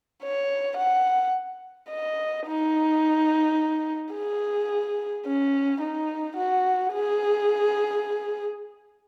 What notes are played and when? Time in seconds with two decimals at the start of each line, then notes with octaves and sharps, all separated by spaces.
0.22 C#5
0.78 F#5
1.89 D#5
2.46 D#4
4.13 G#4
5.26 C#4
5.81 D#4
6.37 F#4
6.93 G#4